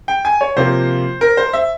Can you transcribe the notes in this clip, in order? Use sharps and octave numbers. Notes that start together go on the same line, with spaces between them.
G5
G#5
C#5
C3 F3 A#3 F4 C5
A#4
C5
E5